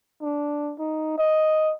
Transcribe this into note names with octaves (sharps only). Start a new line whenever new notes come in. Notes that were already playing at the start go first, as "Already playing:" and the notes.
D4
D#4
D#5